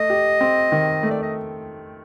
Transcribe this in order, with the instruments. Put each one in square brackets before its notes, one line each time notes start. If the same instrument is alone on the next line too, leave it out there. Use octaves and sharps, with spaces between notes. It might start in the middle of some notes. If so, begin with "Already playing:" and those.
Already playing: [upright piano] A3 [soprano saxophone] D#5
[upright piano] G4
C4
D#3
A3
[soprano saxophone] D5
D#5